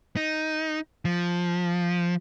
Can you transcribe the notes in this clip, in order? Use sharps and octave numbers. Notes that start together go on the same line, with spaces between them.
D#4
F3